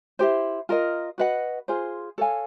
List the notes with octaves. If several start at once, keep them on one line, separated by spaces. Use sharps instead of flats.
E4 G4 C5
F4 A#4 D#5
F#4 B4 D#5 F#5
F4 G#4 C5
A4 C#5 F5 G#5